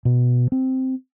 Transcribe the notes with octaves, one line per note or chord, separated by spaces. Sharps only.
B2
C4